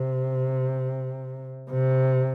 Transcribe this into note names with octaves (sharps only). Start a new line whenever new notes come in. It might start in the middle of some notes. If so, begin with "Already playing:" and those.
Already playing: C3
C3